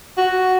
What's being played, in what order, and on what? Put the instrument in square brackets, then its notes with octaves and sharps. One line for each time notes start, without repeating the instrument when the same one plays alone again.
[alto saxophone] F#4